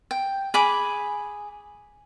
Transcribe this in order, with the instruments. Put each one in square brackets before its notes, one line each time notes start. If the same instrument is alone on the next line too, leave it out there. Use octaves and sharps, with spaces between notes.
[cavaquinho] G5
G#4 B5 D6